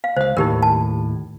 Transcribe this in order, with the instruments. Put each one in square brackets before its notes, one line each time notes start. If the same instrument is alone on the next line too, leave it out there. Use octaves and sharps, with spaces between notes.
[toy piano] F5
[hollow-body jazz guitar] C#2 F5 [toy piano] C5
[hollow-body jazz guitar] D#2 A2 [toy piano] D#4 G4 A#4
[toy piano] A5